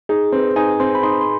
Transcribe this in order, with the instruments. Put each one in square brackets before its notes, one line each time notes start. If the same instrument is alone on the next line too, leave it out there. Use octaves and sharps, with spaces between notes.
[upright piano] D#4 [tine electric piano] G#4
[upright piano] C4 [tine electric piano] B4
[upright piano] D#4 [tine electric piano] G#5
[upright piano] C4 [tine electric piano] C6
[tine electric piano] B5
[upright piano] D#4 [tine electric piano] C6
[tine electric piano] C6